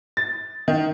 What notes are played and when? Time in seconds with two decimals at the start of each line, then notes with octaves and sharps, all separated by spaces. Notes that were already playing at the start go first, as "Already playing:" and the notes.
0.17 A6
0.68 D#3